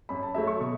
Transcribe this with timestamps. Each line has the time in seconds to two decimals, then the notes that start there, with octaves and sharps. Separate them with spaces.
0.09 F#2 B5
0.23 A5
0.35 F#3 A3 E5
0.47 C#6
0.61 B2